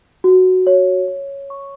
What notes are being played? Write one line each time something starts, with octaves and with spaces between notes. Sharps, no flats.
F#4
C#5
C#5
C#6